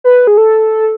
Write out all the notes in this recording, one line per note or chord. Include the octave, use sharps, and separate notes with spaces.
B4
G#4
A4